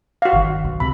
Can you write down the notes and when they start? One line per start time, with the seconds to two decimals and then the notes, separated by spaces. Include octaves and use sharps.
0.22 F#4 F5
0.33 G1 D#3
0.64 B1
0.80 C#2 C3 B5